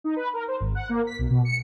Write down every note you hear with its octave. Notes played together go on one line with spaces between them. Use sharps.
D#4
B4
A#4
C5
G#1
F#5
A#3
B6
B1
B2
C#7